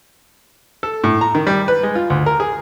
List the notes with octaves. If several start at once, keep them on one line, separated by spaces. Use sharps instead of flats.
A4
A2
A#5
D#3
G3
B4
G#3
F4
D2
A#4
G#4